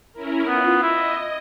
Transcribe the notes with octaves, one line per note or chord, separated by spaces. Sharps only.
C#4 E4 A#4
B3 F4
E4 D#5